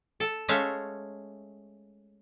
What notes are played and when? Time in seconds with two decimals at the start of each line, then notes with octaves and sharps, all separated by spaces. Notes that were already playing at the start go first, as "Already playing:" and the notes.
0.20 A4
0.48 G#3 A3 C#4 E5 F5